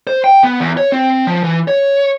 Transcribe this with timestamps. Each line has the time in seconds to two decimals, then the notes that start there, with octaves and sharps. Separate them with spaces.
0.07 C5
0.24 G5
0.44 B3
0.60 E2
0.77 C#5
0.92 C4
1.27 F3
1.44 E3
1.68 C#5